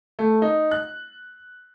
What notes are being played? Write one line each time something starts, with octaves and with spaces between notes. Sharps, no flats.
A3
D#4
F#6